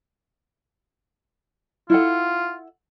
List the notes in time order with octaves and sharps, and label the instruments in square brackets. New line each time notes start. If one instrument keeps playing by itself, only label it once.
[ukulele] E4 A4 F#5 [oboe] F4